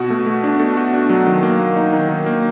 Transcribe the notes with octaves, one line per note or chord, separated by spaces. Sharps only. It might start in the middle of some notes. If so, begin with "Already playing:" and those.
Already playing: B2 F#4
A3
A3
D4
A3
F#4
D4
F#3
D#3
A#3
A#3
D#4
D#3
D#3
A#3